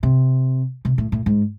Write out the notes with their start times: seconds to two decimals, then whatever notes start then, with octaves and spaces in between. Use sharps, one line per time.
0.03 C3
0.85 C3
0.98 A2
1.12 A2
1.26 G#2